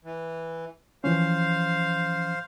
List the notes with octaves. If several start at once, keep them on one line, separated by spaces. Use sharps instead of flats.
E3
E3 F3 C#4 C5 F5